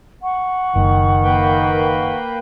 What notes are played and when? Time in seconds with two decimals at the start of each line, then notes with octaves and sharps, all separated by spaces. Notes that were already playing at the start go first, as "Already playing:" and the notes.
0.23 F#5 C#6
0.76 F#1 D#3
1.23 A#3 B4 G5